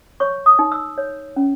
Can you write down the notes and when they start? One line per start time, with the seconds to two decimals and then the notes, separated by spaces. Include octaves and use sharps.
0.20 C#5 C#6
0.46 D#6
0.59 D#4
0.72 E6
0.98 C#5
1.36 C#4